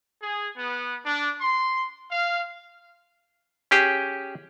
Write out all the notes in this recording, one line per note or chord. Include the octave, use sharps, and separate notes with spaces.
G#4
B3
D4
C6
F5
C#4 G4 G#4